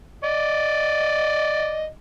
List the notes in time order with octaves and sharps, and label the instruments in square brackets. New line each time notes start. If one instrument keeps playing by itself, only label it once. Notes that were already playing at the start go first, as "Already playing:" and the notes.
[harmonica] D5 D#5